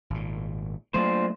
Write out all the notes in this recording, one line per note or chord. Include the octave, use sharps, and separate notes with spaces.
G#1 A#2
F#3 A3 A#3 D4 F4 C5